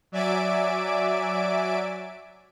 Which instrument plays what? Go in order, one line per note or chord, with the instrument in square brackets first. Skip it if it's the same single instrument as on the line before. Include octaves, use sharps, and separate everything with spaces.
[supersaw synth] F#3 D5 E5 G#5 D6 D7